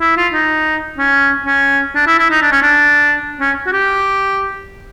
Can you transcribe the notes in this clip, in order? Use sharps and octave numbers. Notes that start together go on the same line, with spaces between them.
E4
F4
D#4
C#4
C#4
D4
E4
E4
D#4
D4
C#4
D4
C#4
F#4
G4